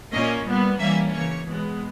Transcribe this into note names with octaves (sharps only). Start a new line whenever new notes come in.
A#2 A#3 C#4 D#5
A#2 G3 B3
E3 G3 A#3 C#4 E5
C#3 E3 A#3 C#5
B2 G#3 B3